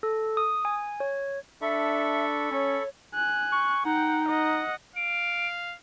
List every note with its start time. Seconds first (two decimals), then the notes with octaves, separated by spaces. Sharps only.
0.03 A4
0.37 D#6
0.65 G#5
1.00 C#5
1.62 D4 A4 E5 B5 C#6
2.51 C#4 C#5
3.14 G#5 F#6
3.52 C#6
3.85 D#4 F#5 G5
4.28 D#5 F#5
4.96 F5 D7